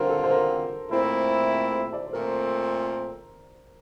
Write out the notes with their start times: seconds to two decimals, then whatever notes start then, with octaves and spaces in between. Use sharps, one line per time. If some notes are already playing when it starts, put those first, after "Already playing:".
Already playing: D3 G3 C4 F4 A#4 C5
0.10 A4
0.24 C5
0.30 A#4
0.91 A#2 A3 C4 E4 C5
1.52 C5
1.73 C5
1.93 D5
2.06 C5
2.13 A#2 A3 C4 A#4